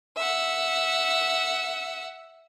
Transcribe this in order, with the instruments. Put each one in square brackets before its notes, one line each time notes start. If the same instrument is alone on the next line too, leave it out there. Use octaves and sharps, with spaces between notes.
[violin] E5 F#5